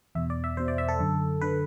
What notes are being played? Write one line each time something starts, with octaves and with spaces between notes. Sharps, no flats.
E2 B2 E5
D5
E5
E2 B2 C5
D5
E5
A4
F#2 D3
D3 B4